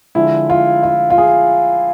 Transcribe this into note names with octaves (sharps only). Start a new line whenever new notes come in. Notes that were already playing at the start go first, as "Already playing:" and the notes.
D3 F3 G#3 E4
F4
F4
F4
G#4